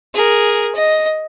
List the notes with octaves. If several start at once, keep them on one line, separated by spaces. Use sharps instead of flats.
G#4 A#4
D#5